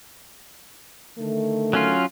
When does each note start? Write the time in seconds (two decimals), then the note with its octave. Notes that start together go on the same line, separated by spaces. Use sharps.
1.17 D3 D#3 A3
1.73 F#3 C#4 F4